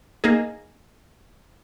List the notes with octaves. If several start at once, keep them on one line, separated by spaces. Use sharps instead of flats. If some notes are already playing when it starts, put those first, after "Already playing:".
A#3 D#4 G#4